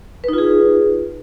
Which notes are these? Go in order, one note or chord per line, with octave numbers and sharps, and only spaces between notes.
D#4 F4 G#4 B4